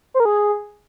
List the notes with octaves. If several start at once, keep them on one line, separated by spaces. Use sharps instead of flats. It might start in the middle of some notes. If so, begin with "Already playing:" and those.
C5
A#4
G#4